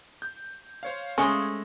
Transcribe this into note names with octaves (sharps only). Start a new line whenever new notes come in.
G6
C5 C#5 F5
G#3 A3 C#4